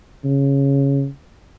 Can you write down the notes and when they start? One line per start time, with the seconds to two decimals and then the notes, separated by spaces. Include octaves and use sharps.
0.24 C#3